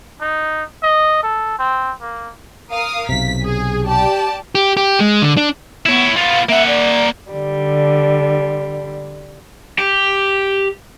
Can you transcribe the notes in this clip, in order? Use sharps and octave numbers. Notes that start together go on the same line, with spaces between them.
D#4
D#5
A4
C4
A#3
A#4 F5 D#6
B1 C3 B6
G#4
G4 D5 A5
G4
G4
G#3
D3
D4
B3 E4 C#5
B3 F4 F5
A#3 E5 F#5
D5
D3 G3
G4